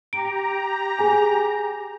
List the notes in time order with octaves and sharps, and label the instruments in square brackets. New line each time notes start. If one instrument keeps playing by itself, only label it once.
[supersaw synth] G4 A#5 [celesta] D7
[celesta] G#4 G#5